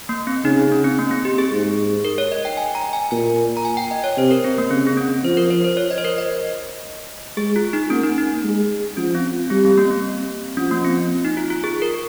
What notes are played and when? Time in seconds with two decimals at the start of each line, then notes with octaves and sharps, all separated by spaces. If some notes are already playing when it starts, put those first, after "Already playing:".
0.09 A#3
0.27 C4
0.44 C#3 D#4
0.58 D#4
0.72 C#4
0.84 C4
0.98 A#3
1.11 C4
1.25 G4
1.38 G#4
1.51 G#2
2.05 A#4
2.18 C#5
2.32 D#5
2.45 G5
2.57 G#5
2.75 A#5
2.93 G#5
3.11 A#2 G#5
3.57 A#5
3.65 G#5
3.77 G5
3.91 D#5
4.04 C#5
4.17 C3 C5
4.31 A#4
4.44 C4
4.58 A#3
4.71 C#3 C4
4.87 C4
4.97 C#4
5.24 F3 C5
5.37 A#4
5.50 C5
5.65 C5
5.77 C#5
5.91 D#5
5.98 C5
6.05 A#4
6.18 D#5
7.37 G#3 G#4
7.56 F4
7.73 D#4
7.90 A#3 C#4
8.04 D#4
8.18 D#4
8.44 G#3
8.97 F3 C#4
9.15 C4
9.50 G3 C4
9.65 C4
9.77 A#3
9.90 C4
10.57 F3 C#4
10.71 A#3
10.85 C4
11.25 D#4
11.37 F4
11.50 F4
11.64 G#4
11.82 A#4